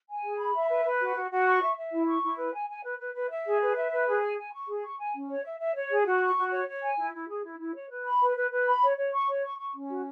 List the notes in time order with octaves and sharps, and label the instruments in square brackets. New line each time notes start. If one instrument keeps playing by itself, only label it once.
[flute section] G#5
G#4
B5
E5
B4
B4
F#4
F#4
F#4
C#6
E5
E5
E4
C#6
E4
B4
G#5
G#5
B4
B4
B4
E5
G#4
B4
E5
B4
G#4
G#5
G#5
C#6
G#4
C#6
G#5
C#4
C#5
E5
E5
C#5
G#4
F#4
C#6
F#4
C#5
C#5
G#5
E4
E4
G#4
E4
E4
C#5
B4
B5
B4
B4
B4
B5
C#5
C#5
C#6
C#5
C#6
C#6
C#4
F#4